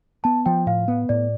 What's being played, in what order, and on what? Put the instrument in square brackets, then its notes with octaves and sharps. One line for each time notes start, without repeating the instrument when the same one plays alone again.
[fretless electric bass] B3 [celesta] A5
[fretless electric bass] F3 [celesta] G5
[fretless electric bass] A2 [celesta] F5
[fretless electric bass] B3
[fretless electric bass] A2 [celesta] D5